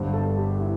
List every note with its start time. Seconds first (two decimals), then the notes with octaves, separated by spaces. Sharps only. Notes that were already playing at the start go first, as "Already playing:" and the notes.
Already playing: G1 G2 D3 C5
0.13 A4
0.38 G4
0.61 E4